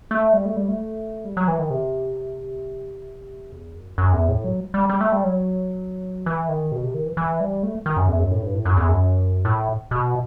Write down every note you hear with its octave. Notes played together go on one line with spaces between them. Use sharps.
A3
G3
A3
G3
A3
G3
F#3
E3
D#3
C3
E2
F#2
F#2
E2
A2
F#3
G3
G3
A3
G3
F#3
E3
D#3
B2
C3
D#3
E3
E3
G3
A3
D#3
F#2
E2
F#2
A2
G2
A2
F#2
E2
F#2
A2
B2